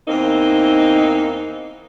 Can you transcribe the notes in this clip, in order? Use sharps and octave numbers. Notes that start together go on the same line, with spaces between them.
E2 A#3 C4 D#4